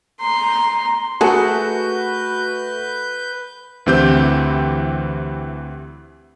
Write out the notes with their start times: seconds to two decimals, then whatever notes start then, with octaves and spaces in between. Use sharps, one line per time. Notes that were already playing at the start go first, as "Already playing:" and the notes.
0.20 A#5 C6
1.21 A3 F#4 G#4 A4 B4 G6 C#7
3.86 D2 E3 C4 G4 G6